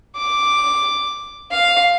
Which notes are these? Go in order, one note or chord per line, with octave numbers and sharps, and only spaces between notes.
D6
F5